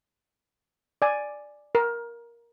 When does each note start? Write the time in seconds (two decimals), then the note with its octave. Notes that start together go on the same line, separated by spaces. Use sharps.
1.02 D5 G#5
1.75 A#4